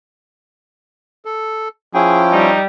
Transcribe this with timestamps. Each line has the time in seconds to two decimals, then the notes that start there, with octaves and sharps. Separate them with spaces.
1.25 A4
1.94 F3 C#4 E4 G#4 G5
2.32 G3 D#4